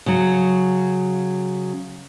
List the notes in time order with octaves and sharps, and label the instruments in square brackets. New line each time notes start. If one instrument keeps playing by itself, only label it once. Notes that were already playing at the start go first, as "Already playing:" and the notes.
[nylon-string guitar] C#3 F#3